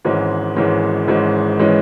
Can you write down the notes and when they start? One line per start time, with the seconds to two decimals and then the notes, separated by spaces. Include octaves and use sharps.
0.05 G#1 G#2 E3 G#3 C#4
0.56 G#1 G#2 E3 G#3 C#4
1.08 G#1 G#2 E3 G#3 C#4
1.59 E3 G#3 C#4